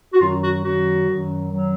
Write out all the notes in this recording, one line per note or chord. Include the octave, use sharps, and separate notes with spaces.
F#4
F#2 D#3 F#3 F4
F#4
F#2 D#3 F#3 F#4
F#2 D#3 F#3
F#2 D#3 F#3